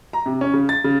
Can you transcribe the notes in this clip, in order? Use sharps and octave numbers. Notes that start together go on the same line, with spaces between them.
A#5
C3
C#4
C#3
A6
C#3